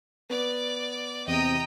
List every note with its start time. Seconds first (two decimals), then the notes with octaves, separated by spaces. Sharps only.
0.30 B3 D5 D6
1.27 E2 C3 D#5 G5 A#5 D#6